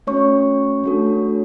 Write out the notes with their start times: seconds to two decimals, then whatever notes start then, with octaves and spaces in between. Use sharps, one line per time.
0.07 A3 C#4 F#4 C#5 C#6
0.84 A3 D4 F#4 A4